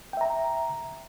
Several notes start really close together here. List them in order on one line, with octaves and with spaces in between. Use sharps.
G5 E5 A#5